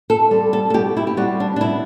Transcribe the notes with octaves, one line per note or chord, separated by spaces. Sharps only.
A4
G3 C4
A4
A4
B2 G4
E4
G4
G3 C4 F#4
D4
D4
B2 E4